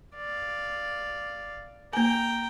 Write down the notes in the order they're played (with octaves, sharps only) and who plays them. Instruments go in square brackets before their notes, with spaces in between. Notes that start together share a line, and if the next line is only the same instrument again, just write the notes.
[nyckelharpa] D5 F5
[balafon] A#3 G#5 [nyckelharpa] G5 A#5